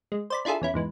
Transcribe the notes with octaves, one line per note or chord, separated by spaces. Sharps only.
G#3
C5 D5 B5
D4 E4 F4 G#4 A4
E2 C#4 E4
E2 G#2 E3